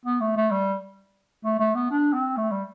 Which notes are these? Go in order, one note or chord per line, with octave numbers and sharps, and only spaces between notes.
B3
A3
A3
G3
A3
A3
B3
D4
C4
A3
G3